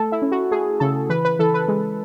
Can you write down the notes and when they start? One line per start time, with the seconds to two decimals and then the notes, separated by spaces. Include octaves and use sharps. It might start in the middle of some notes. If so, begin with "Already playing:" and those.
Already playing: A3 A4
0.12 E4
0.22 C#4
0.32 F#4
0.51 A3 G#4
0.80 C#3 A4
1.09 E3 B4
1.25 B4
1.39 E3 A4
1.54 B4
1.68 G#3